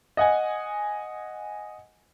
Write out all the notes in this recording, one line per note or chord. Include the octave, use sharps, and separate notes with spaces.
D#5 F#5 G#5